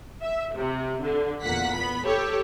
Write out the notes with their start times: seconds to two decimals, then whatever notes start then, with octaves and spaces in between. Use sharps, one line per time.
0.23 E5
0.57 C3
1.03 D3
1.42 E2 A#2 A#3 F#5 B6
1.76 B3 B5
2.06 G4 A4 C#5